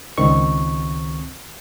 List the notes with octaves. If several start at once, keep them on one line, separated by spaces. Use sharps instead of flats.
C#2 D#3 C4 C#6